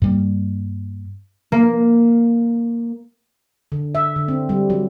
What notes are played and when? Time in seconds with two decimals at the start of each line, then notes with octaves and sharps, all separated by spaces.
0.02 G2 G3 A#3
1.52 A#3
3.72 D3
3.95 E5
4.16 D3
4.28 C4
4.49 G3
4.70 F#3